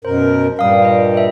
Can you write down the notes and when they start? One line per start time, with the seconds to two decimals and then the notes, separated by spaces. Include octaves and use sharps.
0.05 F#2 B2 A#4 C5
0.59 G2 A#2 G3 F5 D#6
0.82 D#5 G5
1.14 D#5 E5